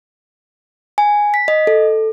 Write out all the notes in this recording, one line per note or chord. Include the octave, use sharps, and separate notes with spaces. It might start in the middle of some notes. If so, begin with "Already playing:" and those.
G#5
B6
D#5
A4